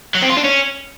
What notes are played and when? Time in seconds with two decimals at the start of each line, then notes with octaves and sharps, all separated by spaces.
0.15 F#3
0.22 C4
0.29 F4
0.37 D4
0.44 C#4